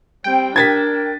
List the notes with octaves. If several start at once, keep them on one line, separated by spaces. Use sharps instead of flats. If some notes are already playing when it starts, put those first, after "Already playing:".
G3 C4 G5
D4 A#4 G#6 A6 B6